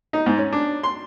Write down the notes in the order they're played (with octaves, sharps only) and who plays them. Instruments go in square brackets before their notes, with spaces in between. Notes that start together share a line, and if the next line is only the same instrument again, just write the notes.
[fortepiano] D#4
G#2
C#4
D4
C6